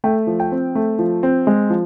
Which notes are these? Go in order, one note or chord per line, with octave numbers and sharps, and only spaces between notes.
A3 G5
F3
G5
C4
A3
F3
C4
G#3
F3